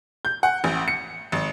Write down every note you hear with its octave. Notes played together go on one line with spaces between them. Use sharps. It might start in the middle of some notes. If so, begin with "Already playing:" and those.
G6
F#5
A1
C#7
G#1